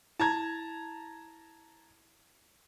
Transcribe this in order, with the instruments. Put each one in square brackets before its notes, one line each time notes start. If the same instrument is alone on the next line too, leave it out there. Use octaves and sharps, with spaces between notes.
[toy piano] E4 [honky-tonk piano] A5 A#5 G#6